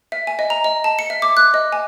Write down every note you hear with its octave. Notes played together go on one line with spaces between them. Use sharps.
E5
G#5
D#5
A#5
D#5
A5
C#7
E5
D6
F#6
D#5
G#5